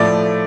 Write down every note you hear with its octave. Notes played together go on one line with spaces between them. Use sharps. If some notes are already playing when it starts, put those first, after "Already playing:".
Already playing: A2 F3 A3 D5